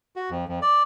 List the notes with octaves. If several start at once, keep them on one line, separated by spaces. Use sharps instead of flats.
F#4
F2
F2
D5